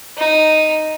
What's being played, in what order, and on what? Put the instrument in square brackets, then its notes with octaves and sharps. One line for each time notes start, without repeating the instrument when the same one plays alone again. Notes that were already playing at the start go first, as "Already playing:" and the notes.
[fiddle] D#4